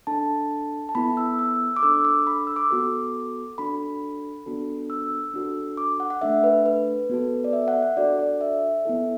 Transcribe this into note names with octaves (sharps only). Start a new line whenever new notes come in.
D4 A4 A5
A5
B3 E4 A4 B5
E6
E6
D6
D4 A4 E6
D6
B5
E6
D6
B3 F#4 A4
D4 F#4 A4 B5
B3 D4 F#4 A4
E6
D4 F#4 A4
D6
F#5
F#5
A3 D4 A4 E5
B4
B4
B3 F#4 A4
D5
E5
F#5
F#5
D4 F#4 A4 D5
D5
E5
B3 E4 A4